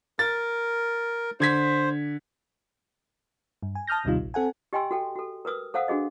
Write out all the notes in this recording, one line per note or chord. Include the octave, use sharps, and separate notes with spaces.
A#4 A6
D3 C5 G#6 B6
G2
G#5
A5 D#6 F6 G6 A#6
G1 D#2 C3 G3 D#4 F4
A#1
C4 A4 F#5 G#5
G4 D#5 G5 G#5 C6 E6
F#4 A4 G5
F#4 A4
A#4 B4 D#6 E6
A4 C5 F5 F#5 D#6 E6
D4 F#4 G#4 D#5